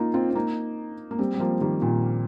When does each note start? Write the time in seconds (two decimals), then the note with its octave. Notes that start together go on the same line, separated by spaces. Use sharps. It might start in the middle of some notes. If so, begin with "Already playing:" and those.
Already playing: A#3 D#4 F4
0.14 C4 F4
0.30 C4
0.35 A#3 D#4
1.11 A#3
1.19 G3 C4
1.34 G3
1.40 F3 A#3
1.61 D#3 G3
1.82 A#2 D#3